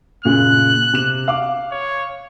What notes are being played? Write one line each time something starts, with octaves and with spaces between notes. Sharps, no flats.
F#2 A#2 C#3 F#6
C3 E7
F5 D6
C#5